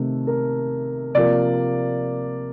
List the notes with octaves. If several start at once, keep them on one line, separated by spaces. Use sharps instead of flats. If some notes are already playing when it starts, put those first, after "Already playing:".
Already playing: C3 D#3 A3
A#4
C3 F3 A#3 D5